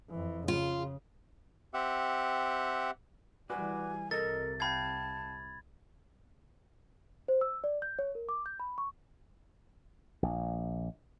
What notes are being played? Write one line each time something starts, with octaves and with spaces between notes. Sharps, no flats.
F2 E3
C#3 F4
C4 G4 E5 F#5
E3 G3 F#4 B4 D5 G#5
C2 C3 A4 A#4 D#5 A6
F5 G5 A5 B5 G#6
C5
E6
D5
G6
C#5
A#4
D6
G6
B5
C#6
A#1